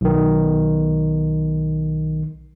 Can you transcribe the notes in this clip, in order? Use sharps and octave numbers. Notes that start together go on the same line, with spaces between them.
B1 D#3